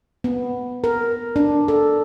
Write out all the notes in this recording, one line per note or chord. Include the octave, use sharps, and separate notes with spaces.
B3
A#4
D4
A4